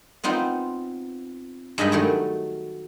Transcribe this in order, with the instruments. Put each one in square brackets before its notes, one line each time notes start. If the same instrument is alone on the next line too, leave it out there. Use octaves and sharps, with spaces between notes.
[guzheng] B3 C4 D#4 F4
G2 G#3 D#4 D#5 B5 C6
D#3 F#3 A3